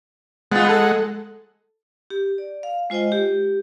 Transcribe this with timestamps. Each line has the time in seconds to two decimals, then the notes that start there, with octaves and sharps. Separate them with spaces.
0.52 G#3 B3 F4 F#5
0.69 A4
2.10 G4
2.38 D5
2.63 F5
2.90 G#3 F4 C5 D#5 G5
3.12 G4